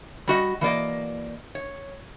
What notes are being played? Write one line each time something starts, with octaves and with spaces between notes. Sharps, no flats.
G3 F#4 D#5
E3 A#3 D5 D#5
C#5